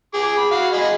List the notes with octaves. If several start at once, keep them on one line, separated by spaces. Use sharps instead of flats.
G#4 D6
B5
F#4 F5
G#4 D#5 B5